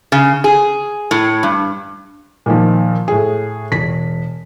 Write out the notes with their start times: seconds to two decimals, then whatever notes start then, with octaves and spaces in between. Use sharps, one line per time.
0.12 C#3
0.44 G#4
1.11 A2
1.43 G2
2.46 A#2 D#3 F3
3.08 A2 G#4
3.71 E1 B6